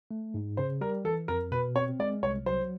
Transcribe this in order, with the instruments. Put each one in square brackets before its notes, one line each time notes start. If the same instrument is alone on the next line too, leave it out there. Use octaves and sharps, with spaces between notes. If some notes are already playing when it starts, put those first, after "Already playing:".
[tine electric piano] A3
G#2
[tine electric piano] C#3 [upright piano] C5
[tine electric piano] G3 [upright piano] A#4
[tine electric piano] E3 [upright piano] A4
[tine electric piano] F2 [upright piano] A#4
[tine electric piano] B2 [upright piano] B4
[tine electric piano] C4 [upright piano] C#5
[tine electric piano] G#3 [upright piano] D5
[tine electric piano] C2 [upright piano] C#5
[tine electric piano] F#3 [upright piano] C5